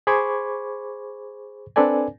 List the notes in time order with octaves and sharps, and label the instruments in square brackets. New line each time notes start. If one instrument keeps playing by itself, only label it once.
[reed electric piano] G#4 C5 B5 C#6 D6 G#6
C4 D4 A4 B4 D5 G#5